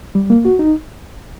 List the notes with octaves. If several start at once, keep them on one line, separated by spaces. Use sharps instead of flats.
G3
A#3
F#4
D#4